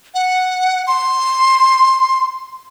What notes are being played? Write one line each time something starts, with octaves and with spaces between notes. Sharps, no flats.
F#5
C6